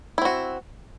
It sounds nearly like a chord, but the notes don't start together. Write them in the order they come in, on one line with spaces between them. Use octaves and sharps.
E4 C4 F#4